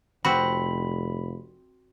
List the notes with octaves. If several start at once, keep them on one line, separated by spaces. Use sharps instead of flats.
F1 C4 F#4 B5